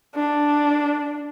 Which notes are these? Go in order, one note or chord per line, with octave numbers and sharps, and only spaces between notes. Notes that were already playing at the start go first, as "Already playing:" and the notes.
D4